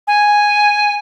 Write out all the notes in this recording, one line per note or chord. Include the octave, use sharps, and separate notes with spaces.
G#5